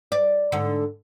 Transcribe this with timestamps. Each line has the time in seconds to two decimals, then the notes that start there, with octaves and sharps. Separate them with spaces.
0.12 D5
0.52 G#2 D3